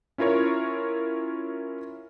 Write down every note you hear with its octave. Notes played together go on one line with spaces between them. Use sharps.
C#4 E4 F4 A#4 C#5